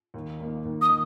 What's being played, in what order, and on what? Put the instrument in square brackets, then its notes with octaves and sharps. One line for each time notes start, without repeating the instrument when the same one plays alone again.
[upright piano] D#2
D#3 A#3
D#2
[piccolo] D#6
[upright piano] D#3